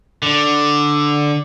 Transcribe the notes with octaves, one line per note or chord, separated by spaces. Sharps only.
D3